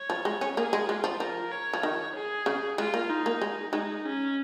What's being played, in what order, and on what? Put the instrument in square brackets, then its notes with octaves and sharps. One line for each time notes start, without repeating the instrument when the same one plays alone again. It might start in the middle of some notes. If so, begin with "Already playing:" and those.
Already playing: [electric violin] C#5
[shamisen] F3
G#3
C#4
[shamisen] A#3 [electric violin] G#4
[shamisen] G#3
[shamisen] G#3 [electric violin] F4
[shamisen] F3
[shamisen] F3 [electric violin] A#4
[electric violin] C#5
[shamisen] F3
D#3
[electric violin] G#4
[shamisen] C#3
[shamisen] G#3 [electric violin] F4
[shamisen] A#3
[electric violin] D#4
[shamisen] A#3
G#3
[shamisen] G#3 [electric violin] D#4
[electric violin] C#4